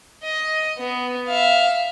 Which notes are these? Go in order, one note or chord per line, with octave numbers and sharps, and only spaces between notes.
D#5
B3
E5 F5